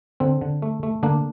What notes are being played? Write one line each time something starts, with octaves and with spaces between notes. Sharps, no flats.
D3 C4
D3
A3
A3
D3 A#3 D4